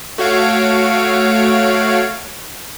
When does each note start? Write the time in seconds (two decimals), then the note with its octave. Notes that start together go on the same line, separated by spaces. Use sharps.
0.18 A3 F#4 C#5 F5 D7